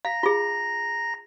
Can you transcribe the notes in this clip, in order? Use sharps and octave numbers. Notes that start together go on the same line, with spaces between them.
F5 A#5 A#6
F4 G#4